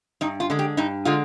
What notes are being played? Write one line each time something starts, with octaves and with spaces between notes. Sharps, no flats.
G2 D#4
F4
D3 G#3
G4
G2 D#4
D3 G#3 F4